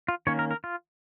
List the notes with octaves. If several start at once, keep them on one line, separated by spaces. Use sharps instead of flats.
F4
D#3 A#3 C#4 C#5
A#4
A#4
F4